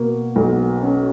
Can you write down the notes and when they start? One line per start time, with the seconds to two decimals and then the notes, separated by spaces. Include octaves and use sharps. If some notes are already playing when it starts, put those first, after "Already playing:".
Already playing: B2 A#3
0.36 B1
0.82 C#4